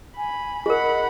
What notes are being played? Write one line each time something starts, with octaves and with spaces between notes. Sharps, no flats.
G#5 B5
G#4 A#4 D#5 F#5 B5